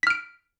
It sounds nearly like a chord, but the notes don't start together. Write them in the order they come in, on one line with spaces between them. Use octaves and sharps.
B6 F6 D7